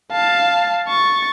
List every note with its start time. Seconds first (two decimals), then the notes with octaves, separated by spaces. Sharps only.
0.12 F5 A5
0.89 C#6 A6